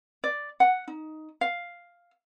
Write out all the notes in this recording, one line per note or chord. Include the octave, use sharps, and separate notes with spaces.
D5
F#5
D#4
F5